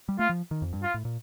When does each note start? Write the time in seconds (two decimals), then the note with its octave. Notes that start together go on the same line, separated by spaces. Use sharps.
0.09 G3
0.19 A3 F4
0.30 F3
0.51 D#3
0.62 F2
0.73 G2
0.83 F4
0.94 A2
1.05 A#2